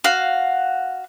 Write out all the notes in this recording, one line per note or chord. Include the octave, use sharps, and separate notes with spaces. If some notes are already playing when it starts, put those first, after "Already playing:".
F#4 F5